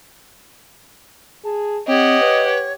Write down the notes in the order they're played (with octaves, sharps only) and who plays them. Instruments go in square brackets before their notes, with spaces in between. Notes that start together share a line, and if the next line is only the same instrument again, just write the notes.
[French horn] G#4 [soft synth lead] A5
[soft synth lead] C4 [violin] G4 F#5 [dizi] C#5 [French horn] D#5
[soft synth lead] B4